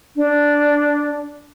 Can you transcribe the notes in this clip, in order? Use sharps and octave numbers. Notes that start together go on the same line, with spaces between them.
D4